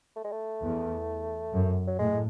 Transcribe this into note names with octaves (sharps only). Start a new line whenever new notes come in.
A3
G#3
A3
E2
F#2
F#3
A2 G#3